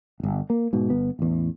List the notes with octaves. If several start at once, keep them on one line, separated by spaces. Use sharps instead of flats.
D1 G1
A#3
G#2 B2
G1 B3
A1 E2